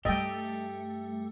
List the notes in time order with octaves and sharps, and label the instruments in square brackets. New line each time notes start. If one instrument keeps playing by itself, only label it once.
[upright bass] G2 G3 [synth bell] A3 [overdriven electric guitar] G4 [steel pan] D#5 G5